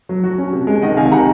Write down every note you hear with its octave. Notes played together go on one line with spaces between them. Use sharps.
F#3
F#4
C#4
C3
G#3
D#3 D#5 F#5
C3 F5 G#5
D#3 F#5 A#5